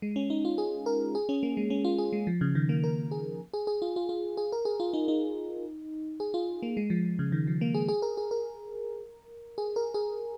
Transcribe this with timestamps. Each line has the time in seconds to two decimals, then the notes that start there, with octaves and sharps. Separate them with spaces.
0.02 G#3
0.16 C#4
0.30 D#4
0.45 F4
0.58 G#4
0.86 A#4
1.15 G#4
1.29 C#4
1.43 A#3
1.57 G#3
1.70 C#4
1.85 F4
1.98 G#4
2.13 G#3
2.27 F3
2.41 C#3
2.55 D#3
2.69 A#3
2.84 A#4
3.11 G#4
3.53 G#4
3.67 G#4
3.82 F4
3.96 F4
4.09 F4
4.37 G#4
4.52 A#4
4.65 G#4
4.80 F4
4.93 D#4
5.08 D#4
6.20 G#4
6.34 F4
6.63 A#3
6.77 G#3
6.90 F3
7.19 C#3
7.32 D#3
7.47 F3
7.61 A#3
7.74 G#4
7.88 G#4
8.02 A#4
8.17 G#4
8.31 A#4
9.58 G#4
9.76 A#4
9.94 G#4